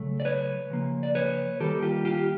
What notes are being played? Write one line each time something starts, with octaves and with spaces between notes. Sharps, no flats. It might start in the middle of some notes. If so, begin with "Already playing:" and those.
Already playing: C#3 F#3 A3
D5
B4 C#5
C#3 F3 A#3
D5
B4 C#5
D#3 G3 A#3 G4 A4
F4 G4
F4 G4